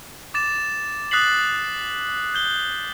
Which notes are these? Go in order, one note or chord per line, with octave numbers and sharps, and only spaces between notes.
D6 A6 E7
D#6 F#6 A6 B6 C7 F#7
G6 G7